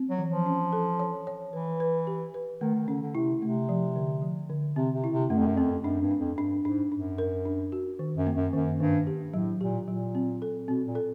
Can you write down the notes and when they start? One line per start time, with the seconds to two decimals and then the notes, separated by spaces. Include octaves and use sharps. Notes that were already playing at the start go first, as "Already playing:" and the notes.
Already playing: C4
0.10 F#3
0.19 E3
0.28 F3
0.46 C#4
0.73 A4
0.99 C#5
1.27 C#5
1.53 E3 B4
1.80 B4
2.07 G4
2.34 B4
2.61 D#3 A3
2.74 D#3
2.88 D3 C#4
3.02 D3
3.15 C3 E4
3.42 C3 A3
3.69 F3
3.96 D3
4.22 F3
4.50 D3
4.76 C3 C4
4.94 C3
5.04 E4
5.12 C3
5.30 F#2 A3
5.38 F2
5.46 F#2
5.57 F2 C4
5.84 F#2 D4
6.02 G2
6.11 D4
6.20 F2
6.38 G2 D4
6.65 G#2 D4
6.92 F#2 D4
7.18 A#4
7.46 D4
7.72 F#4
7.99 D#3
8.17 F#2
8.27 A#3
8.35 F#2
8.53 F#2 D#3
8.80 G2 D#3
9.07 G4
9.34 A2 F#3
9.61 A#2 G4
9.88 A#2 F#3
10.15 C4
10.42 A4
10.68 B2 C4
10.86 A#2
10.95 A4